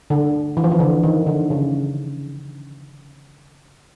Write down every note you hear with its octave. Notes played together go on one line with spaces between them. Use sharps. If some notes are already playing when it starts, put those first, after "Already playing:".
D3
E3
F3
E3
D3
D#3
D3
C#3